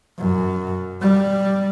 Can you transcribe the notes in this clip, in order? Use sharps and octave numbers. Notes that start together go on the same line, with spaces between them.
F#2
G3